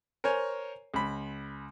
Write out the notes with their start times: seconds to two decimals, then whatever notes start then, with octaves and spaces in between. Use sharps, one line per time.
0.24 A#4 C5 C#5 G#5
0.94 C#2 B5